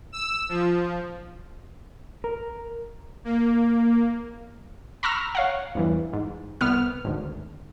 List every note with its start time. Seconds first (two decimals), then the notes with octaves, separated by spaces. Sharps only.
0.12 E6
0.49 F3
2.24 A#4
3.25 A#3
5.03 A#5 B5 C#6 E6 F6 A#6
5.35 C#5 F5 F#5
5.75 E2 G2 E3
6.13 G#2
6.61 C2 B3 F6
7.05 G#1 D2